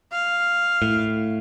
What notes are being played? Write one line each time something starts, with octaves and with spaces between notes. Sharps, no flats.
F5
A2